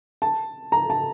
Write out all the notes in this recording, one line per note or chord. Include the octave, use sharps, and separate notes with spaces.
A5
A#5
A5